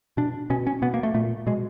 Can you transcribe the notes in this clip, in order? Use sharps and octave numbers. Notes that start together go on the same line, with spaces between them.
B2 D4
B2 C#4
C#4
B2 B3
A#3
A3
A#2 A3
B2 G#3